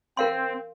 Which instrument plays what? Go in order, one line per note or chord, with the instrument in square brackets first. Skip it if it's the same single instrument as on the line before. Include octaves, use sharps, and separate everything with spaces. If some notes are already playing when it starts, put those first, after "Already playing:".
[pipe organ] C4 [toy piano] A#4 F5 C6